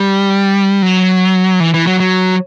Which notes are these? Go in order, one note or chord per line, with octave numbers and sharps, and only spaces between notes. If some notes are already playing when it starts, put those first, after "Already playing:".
Already playing: G3
F#3
E3
E3
F#3
F#3